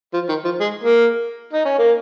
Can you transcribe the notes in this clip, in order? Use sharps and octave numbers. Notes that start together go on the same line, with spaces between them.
F3
D#3
F3
G#3
A#3
D#4
C#4
A#3